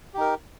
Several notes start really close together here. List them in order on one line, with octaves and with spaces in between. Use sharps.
G4 D#4 A#4